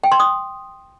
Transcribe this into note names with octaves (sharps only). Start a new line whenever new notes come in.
G5
C6
D#6